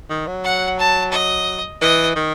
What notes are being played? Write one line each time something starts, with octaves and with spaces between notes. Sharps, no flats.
D#3
F#3
F#5
A5
D#5
E3 D#5
D#3